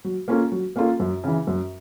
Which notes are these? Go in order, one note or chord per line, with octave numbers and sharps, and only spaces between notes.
F#3
A#3 C#4 F4 A4
F#3
A#3 C#4 F4 A4
F#2
C#3 E3
F#2